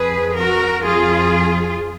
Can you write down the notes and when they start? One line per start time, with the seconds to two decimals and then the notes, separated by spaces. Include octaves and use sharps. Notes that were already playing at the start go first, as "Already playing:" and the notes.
Already playing: F2 F3 G#4 B4
0.38 F#4 A#4
0.86 F2 F3 F4 G#4